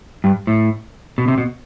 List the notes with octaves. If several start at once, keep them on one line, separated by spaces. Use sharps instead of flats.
G2
A2
B2
C3
B2